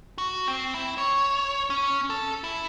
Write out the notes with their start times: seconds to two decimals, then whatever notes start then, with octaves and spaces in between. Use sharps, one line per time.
0.18 F#4
0.48 C4
0.74 E4
0.98 C#5
1.70 C#4
2.10 A4
2.44 E4